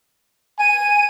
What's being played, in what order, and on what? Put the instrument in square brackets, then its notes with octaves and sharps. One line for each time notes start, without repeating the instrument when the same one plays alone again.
[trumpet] G#5 [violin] D#7